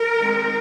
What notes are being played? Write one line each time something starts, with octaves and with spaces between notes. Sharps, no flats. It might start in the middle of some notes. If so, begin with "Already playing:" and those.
Already playing: A#4
D#3 G#3 C4